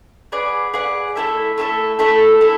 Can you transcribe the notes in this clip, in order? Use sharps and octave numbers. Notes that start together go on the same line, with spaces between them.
G#4 B4 D5 F#5
G#4 B4 D5 F#5
A3 E4 A4 E5
A3 E4 A4 E5
A3 E4 A4 E5
A3 E4 A4